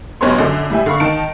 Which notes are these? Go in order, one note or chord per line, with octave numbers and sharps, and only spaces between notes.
B1 G2 B2 B4 C#5 C6
F#2 D3
A2 G3 E5 G#5
D3 F5 B5 C#6
D#3 D#4 A5 D7